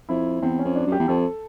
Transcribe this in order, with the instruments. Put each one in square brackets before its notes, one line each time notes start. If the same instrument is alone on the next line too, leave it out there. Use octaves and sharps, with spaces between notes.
[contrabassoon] F2 [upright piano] E4
[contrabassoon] E2 [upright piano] C4
[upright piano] C#4
[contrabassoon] F2
[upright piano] D4
[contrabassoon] F#2
[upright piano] G4
[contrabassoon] E2
[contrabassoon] F2 [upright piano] A4